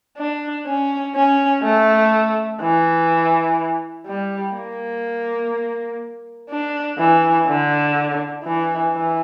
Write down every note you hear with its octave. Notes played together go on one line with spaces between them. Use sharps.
D4
C#4
C#4
A3
E3
G3
A#3
D4
E3
D3
E3
E3